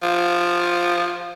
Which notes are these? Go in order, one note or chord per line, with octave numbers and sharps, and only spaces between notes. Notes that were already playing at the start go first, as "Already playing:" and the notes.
F3